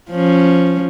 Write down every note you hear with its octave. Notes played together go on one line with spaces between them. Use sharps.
F3 C#4